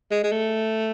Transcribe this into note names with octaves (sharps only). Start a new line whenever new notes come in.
G#3
G#3
A3